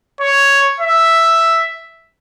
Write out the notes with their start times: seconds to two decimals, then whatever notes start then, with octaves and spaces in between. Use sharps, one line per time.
0.21 C#5
0.80 E5